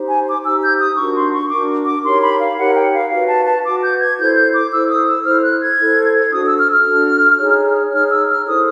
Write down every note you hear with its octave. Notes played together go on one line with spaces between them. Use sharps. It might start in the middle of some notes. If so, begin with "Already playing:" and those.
Already playing: D#4 G4 C5
G#5
D6
D#4 G4 C5 E6
G6
D#6
D4 F#4 A#4 C#6
C6
C#6
D4 F#4 A#4 D6
D6
D#4 G4 A#4 C#5 C6
B5
F5
D#4 G4 A#4 C#5 F#5
G5
F5
F#4 B4 F5
A5
A5
F#4 B4 D6
G6
G#6
E4 A4 C5 G6
G6
D6
E4 A4 C5 E6
D#6
E6
E4 A4 C5 F6
F#6
G#6
E4 A4 C5
D4 F#4 A4 D#6
E6
F6
F6
D4 F#4 A4
D#4 G#4 C#5
D#4 G#4 C#5 F6
E6
F6
E4 A4 C5 D#6